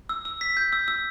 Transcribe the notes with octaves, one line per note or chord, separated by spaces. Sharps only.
E6
E6
B6
G6
E6
E6